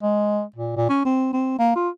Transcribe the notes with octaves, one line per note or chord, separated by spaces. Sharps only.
G#3
A#2
A#2
C#4
C4
C4
A#3
F4